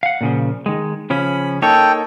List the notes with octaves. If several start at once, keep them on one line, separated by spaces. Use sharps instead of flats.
F5 F#5
A#2 C#3 F3
D#3 G#3
C#3 F3 C#4 B5
A#3 D#4 A4 C#5 G5